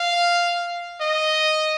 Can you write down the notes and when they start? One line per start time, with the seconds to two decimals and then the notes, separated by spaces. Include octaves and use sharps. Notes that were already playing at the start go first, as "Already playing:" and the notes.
Already playing: F5
1.01 D#5